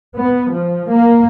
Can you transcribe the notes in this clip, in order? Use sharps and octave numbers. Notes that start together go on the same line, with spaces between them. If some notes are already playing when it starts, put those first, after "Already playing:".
B3
F3
A#3